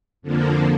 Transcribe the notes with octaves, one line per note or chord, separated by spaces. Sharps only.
F2 D3 F3 A#3